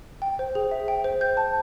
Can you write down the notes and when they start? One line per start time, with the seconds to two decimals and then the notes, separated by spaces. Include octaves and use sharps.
0.22 G5
0.39 C5
0.55 G#4
0.71 E5
0.88 G5
1.04 C5
1.21 G6
1.37 A5